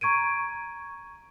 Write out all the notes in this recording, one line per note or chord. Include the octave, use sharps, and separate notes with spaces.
A#5 C#6 G#6 D7 D#7